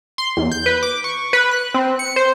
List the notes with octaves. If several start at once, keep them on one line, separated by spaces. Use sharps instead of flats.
C6
E2
G6
B4
D6
C#6
B4
F#6
C4
C#7
C5